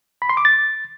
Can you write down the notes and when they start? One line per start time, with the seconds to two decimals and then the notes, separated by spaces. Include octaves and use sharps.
0.22 B5
0.29 C6
0.37 D6
0.45 A6